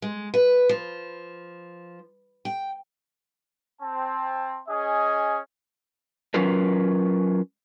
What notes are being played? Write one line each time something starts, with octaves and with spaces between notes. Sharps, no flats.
G#3
B4
F3
G5
C4 A5
C#4 G#4 D#5
F#3 C#4 F4 A#4 B4